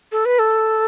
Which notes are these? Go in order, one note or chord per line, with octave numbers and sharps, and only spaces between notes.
A4
B4
A4